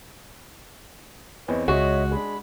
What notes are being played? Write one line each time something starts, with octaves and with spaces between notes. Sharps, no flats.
E2 C4 B4 C#5 D#5
C#2 G#3 F#4 C#5 D#5 E5
G#3 D4 B5